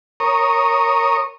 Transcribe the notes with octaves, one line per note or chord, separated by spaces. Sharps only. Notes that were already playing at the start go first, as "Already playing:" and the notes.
A#4 C#5 D#6